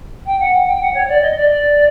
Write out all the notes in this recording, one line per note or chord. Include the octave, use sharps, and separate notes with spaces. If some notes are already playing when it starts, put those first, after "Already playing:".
G5
F#5
G5
F#5
C#5
D5
D#5
D5